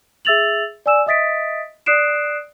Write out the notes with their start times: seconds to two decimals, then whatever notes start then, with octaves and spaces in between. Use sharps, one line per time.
0.25 G#4 E5 E6 A6 F7 F#7
0.86 D5 G#5 E6 E7
1.06 D#5 E5 D#6 A6 B6 D7
1.86 D5 D#6 F#6 C7 D7 E7